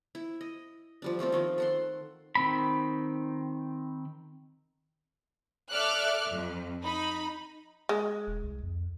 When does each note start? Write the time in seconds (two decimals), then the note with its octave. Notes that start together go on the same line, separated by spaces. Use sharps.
0.15 E4
0.41 D#5
1.02 F3 G3 D4
1.19 G3 A3 C4 F4
1.32 D#3 F3 A3
1.58 A4 F#5 C6
2.35 D#3 C4 B5
5.71 A4 D5 E5 D6 F6 F#6
6.30 F2
6.83 D#4 B5
7.89 G#3
8.27 E1
8.43 C2
8.63 F2